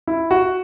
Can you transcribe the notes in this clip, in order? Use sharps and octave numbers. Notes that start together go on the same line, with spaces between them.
E4
F#4